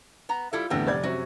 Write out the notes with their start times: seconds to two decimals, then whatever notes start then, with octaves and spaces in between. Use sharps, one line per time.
0.29 B3 A#5
0.53 G3 E4 F4 A4
0.70 E2 A2 D3 G3 B3 C4
0.87 F1 D5 G#6
1.03 F#2 C3 F#4